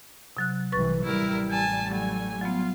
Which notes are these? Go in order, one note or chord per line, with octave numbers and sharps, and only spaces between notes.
C3 F#3 F#6
C2 E3 B4 C#6 A6
A1 G3 E4 A#4
G#5 A5
F#3 A3 G#5
F#3 B3 F4